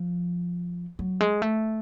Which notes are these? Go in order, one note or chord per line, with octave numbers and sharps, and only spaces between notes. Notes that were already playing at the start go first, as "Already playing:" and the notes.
Already playing: F3
F#3
G#3
A3